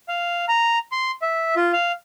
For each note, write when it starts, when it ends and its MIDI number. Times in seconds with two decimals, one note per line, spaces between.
0.08 0.45 77
0.48 0.78 82
0.92 1.11 84
1.22 1.55 76
1.56 1.72 65
1.73 1.92 77